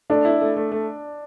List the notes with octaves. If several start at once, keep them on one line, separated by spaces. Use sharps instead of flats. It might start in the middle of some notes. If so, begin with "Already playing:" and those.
A3 D4
E4
A3
A3
A3